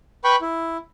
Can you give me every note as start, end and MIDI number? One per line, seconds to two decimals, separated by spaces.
0.24 0.36 71
0.24 0.36 79
0.24 0.36 83
0.24 0.36 85
0.41 0.77 64